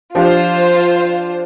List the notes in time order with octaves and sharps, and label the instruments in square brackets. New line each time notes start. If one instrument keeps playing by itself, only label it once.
[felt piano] F3 D4 G4 [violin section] F4 C5